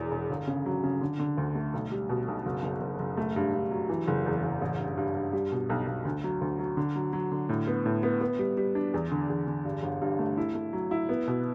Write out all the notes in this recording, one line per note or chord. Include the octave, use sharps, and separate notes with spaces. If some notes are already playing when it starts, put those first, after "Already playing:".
Already playing: E1 E2 E3
E1
G1
C#3
F#3
C#3
D3
D3
D2
A3
B1
G3
B2
B1
F#1
F#1
F#1
F#1
A3
G2
G2
F#3
E3
F#1
E2
F#1
A1
G2
G2
G2
G3
B2
B1
B1
D2
F#3
D2
F#3
D3
F#3
F#3
D3
A2
B3
A2
B3
B3
G3
G3
D4
E2
D3
E2
D3
G2
G1
G2
A3
E4
A3
F#3
E4
B3
B2